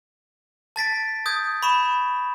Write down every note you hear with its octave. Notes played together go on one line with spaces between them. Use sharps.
A5 A6 B6 D7
D#6 G6 G#6
B5 C#6 E7